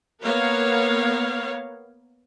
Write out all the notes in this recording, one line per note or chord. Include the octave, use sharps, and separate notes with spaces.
A#3 B3 A#4 C#5 F5